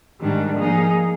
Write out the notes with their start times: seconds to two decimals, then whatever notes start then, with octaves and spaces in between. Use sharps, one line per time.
0.20 G#2 D#3 G3 D4
0.56 F3 A#3 D#4 G#4